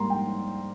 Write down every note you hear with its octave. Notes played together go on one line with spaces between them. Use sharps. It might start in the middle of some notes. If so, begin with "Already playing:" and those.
Already playing: G#2 G3 A#3 A#5 C6
G5